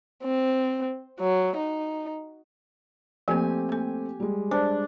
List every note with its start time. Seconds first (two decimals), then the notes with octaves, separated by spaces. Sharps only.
0.24 C4
1.20 F#3
1.57 D#4
3.28 F3 A3 A#3 C4 G4 G#5
3.69 A#3 A4
4.20 G3 G#3
4.51 D4 C5